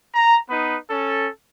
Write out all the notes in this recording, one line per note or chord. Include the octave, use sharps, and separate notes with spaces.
A#5
B3 D#4 B4
C#4 A4